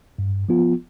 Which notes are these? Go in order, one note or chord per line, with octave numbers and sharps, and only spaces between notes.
G2
F3 B3 F4